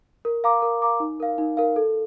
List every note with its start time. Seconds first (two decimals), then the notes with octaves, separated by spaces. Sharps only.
0.25 A#4
0.44 F5 A#5 D6
0.62 A#4
0.82 F5 A#5 D6
1.00 D#4
1.20 A#4 F5
1.38 D#4
1.57 A#4 F5
1.76 A4